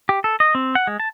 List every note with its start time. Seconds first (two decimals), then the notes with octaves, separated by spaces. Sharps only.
0.09 G4
0.24 A4
0.40 D#5
0.55 C4
0.75 F#5
0.87 G#3
1.00 A5